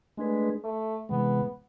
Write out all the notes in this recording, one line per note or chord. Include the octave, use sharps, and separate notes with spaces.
G#3 A3 D4 G#4 B4
A3
C3 E3 G#3 B3